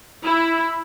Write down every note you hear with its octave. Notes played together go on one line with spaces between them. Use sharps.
E4